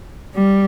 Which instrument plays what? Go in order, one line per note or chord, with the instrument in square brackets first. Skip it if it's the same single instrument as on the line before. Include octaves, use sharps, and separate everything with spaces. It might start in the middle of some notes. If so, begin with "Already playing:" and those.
[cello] G3